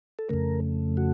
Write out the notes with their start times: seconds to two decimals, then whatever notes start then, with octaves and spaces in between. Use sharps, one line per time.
0.19 A4
0.29 F2 C#3 A3 A#4
0.97 F#4